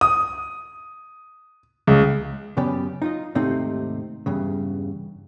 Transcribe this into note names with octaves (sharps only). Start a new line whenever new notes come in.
D#6
C#2
F#2 C#3 B3 C#4 G4 D5
D#4 F4 D#5
D#2 G#2 C3 A3 C4 D#4
E2 G2 C#3